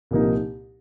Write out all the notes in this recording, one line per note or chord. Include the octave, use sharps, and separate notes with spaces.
C2 A#2 F3 A#3 D#4